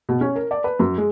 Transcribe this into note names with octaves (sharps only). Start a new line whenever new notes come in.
B2
C#4
A#4
D5
B4
F#2
G#3